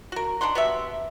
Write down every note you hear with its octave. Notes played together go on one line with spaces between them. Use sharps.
F#4 A#4
D4 D#4 F#5 C6
B3 F#4 G4 E5